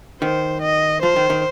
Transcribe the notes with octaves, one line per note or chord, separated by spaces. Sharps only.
D#3 C5
D#5
F3 C5
D#3
D#3